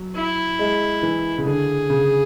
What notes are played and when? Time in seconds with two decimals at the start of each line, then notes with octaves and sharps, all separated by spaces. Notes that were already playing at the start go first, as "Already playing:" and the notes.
Already playing: F#3
0.16 E4
0.59 G#3
1.03 E3
1.38 C#3
1.46 D3 G#4
1.90 C#3